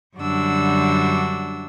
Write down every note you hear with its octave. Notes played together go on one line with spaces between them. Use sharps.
F#2 D3 G3 D4 F#4 E6